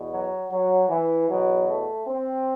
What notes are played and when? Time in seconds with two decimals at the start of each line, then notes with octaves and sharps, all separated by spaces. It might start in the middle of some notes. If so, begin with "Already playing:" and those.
Already playing: E2 B2
0.10 F#3
0.49 F#3
0.89 E3
1.28 E2 B2 F#3
1.68 A3
2.07 C4